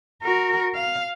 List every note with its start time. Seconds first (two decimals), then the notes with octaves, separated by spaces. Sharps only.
0.23 F#4 A#4
0.75 F5